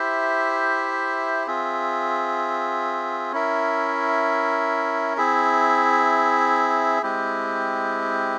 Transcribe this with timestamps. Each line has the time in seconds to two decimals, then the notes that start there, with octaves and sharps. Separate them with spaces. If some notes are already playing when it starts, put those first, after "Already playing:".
Already playing: E4 G4 C5 E5
1.47 C4 F4 G#4 E5
3.32 C#4 E4 A#4 E5
5.17 C4 E4 G#4 E5
7.03 G#3 C4 E4 G4